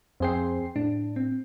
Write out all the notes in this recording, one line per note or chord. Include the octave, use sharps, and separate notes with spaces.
F2 C4 G#4 C5 G5 C7
A2 D4
C4